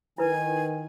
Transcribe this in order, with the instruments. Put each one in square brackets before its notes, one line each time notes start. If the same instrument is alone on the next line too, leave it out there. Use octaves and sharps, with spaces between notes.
[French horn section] D#3 [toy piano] E4 B4 [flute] G#5